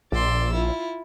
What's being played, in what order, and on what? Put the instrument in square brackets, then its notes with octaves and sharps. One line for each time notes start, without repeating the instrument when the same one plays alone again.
[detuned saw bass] A#1 [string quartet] D5 C6 E6
[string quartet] E4 F4